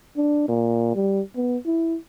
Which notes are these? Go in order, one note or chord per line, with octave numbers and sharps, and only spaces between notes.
D4
A#2
G3
B3
E4